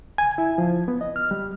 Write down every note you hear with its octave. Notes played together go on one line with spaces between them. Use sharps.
G#5
E4
F3
B3
D#5
F6
G3